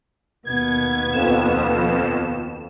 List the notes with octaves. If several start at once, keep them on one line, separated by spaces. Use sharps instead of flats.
D#2 B2 B3 G#6
F2 E7